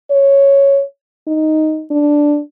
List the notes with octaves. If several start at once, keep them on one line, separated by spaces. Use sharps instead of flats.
C#5
D#4
D4